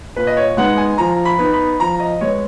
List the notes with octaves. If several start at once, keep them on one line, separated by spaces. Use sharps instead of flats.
A#2 B4
D#5
C#5
G#3 B3 D#4 F#5
G#5
F3 A#5
B5
B3 D#4
B5
F3 A#5
D#5
G#3 B3 C#5